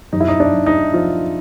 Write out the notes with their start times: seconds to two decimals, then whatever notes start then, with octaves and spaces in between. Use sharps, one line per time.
0.13 F#2 D#4
0.20 E4
0.28 D#4
0.40 D4
0.54 F#2
0.66 D#4
0.93 F3 F4